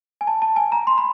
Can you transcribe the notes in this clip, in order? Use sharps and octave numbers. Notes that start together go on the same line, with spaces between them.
G#5
A5
A5
G#5
A#5
C6
B5